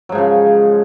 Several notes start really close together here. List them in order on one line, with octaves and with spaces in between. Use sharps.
F#3 G#2 F3 C#3